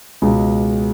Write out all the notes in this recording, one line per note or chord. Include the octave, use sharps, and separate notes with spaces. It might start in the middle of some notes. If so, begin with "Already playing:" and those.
C#2 B2 G#3